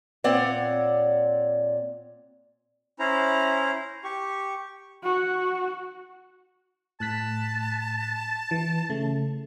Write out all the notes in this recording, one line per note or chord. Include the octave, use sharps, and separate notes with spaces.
A#2 C4 C#5 D5 F#5
C#4 E4 C5 A#5
G4 C#6
F#4
A2 A5 F#6 B6
E3
C#3 A3